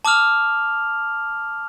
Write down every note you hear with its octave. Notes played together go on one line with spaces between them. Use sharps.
A5 D6 D#6 F6 F7